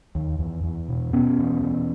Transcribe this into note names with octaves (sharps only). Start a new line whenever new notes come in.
D#2
E2
E2
B2
B2 B3 C#4
E2
E2